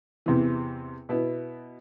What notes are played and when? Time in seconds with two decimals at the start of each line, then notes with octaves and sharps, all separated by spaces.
0.26 E2 C3 E3
1.09 B2 B3 E4